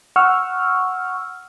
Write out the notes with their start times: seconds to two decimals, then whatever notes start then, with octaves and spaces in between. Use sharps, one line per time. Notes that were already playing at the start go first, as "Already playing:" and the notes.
0.16 F#5 C#6 E6 F6